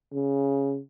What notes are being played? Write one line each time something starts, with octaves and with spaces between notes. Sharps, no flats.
C#3